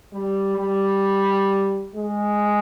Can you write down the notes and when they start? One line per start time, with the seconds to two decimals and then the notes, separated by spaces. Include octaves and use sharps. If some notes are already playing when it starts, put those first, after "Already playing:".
0.12 G3
0.58 G3
1.95 G#3